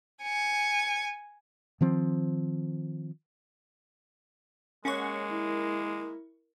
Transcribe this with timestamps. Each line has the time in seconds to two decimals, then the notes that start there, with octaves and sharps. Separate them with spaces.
0.23 G#5 C#7
1.81 D#3 F3 C4
4.85 G#3 A#3 C#4 F#5 C#6
5.29 E4 A#4